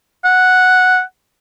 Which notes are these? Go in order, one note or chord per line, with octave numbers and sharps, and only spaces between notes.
F#5